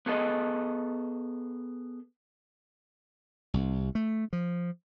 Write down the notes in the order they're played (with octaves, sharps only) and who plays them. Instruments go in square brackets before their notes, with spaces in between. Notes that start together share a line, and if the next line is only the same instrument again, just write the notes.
[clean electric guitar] B3 G#4 A4 D#5
[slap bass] C2
A3
F3